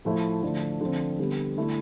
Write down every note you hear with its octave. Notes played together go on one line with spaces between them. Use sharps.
A2 F3 A3 E4
D3 F3 A3 D4
D3 F3 C4
D3 G3 B3
D3 A3 E4